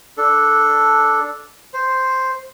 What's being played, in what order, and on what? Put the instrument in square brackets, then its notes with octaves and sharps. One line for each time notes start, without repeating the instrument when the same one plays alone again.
[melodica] D4 A4
C5